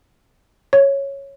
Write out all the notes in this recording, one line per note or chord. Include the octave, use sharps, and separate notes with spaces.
C#5